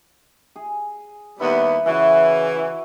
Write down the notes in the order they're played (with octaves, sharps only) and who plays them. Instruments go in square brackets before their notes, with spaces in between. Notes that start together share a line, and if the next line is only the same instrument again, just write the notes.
[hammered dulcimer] G#4
[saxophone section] D#2 G3 B3 [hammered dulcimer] E4
[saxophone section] C#3 E3 [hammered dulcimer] E4 F#4 E5